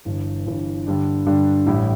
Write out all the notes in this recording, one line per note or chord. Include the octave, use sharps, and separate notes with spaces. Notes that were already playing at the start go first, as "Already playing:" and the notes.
G1 G2 E3
G1 G2 E3
G2 D3 G3 D4
G2 D3 G3 D4
A1 A2 G3 E4